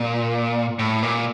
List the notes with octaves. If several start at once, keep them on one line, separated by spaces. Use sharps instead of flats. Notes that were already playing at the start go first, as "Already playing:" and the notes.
Already playing: A#2
A2
A#2